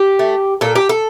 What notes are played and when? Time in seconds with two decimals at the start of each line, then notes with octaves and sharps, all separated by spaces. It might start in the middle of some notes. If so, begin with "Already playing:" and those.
Already playing: G4
0.19 A3
0.61 A#2 A4
0.75 G4
0.89 A4